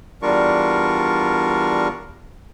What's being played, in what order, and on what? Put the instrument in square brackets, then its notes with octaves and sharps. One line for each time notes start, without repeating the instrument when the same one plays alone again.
[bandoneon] E2 G3 D4 F4 A#4 C#6